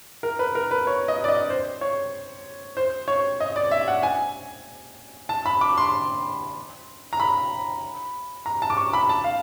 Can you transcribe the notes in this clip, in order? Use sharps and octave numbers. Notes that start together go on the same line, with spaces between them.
A#4
B4
A#4
B4
C#5
D#5
D5
D#5
C5
C#5
C5
C#5
D#5
D5
E5
F#5
G#5
A5
B5
D6
C6
A#5
B5
A#5
A5
D6
C#6
B5
A5
F5